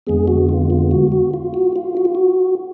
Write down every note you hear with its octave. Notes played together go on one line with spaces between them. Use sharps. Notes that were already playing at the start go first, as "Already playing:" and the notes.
F2 D3 G#3 B3 G#4
F#4
F4
F4
F#4
F#4
F4
F#4
F4
F#4
F4
F#4